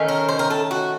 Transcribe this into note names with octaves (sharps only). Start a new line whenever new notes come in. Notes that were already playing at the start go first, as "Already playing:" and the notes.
Already playing: D#3 A3 C#4
A#4
C5
A#4
A4
F#4